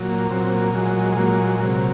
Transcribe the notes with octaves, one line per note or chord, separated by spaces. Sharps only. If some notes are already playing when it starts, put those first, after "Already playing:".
Already playing: A#2 F#3
A#3
A#2 F#3 C4
A#3
A#2 F#3 G#3
G#3
A#2 F#3 A#3
G#3
C3 F#3 A#3